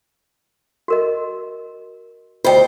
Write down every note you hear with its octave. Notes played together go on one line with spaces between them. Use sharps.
F#4 A#4 D#5
D2 F4 C5 D#5 G5